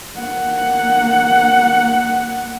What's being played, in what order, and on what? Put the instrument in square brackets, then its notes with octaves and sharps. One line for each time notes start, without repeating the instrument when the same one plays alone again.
[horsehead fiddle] A#3 F#5